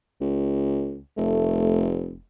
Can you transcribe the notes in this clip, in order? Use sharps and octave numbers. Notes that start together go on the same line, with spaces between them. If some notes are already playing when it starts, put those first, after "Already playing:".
C#2
F1 A3